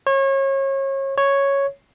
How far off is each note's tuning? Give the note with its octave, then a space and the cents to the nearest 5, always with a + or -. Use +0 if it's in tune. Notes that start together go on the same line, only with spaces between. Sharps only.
C#5 -30
C#5 +0